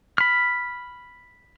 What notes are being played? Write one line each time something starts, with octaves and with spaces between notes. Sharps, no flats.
B5 F6